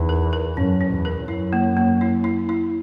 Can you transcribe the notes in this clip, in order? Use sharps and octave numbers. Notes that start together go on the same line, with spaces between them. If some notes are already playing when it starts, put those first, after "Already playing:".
Already playing: E2 D#4
A#4
A#4
F#2 C#4
C#4
E2
A#4
F#2 E4
A#3
A#3
E4
E4
E4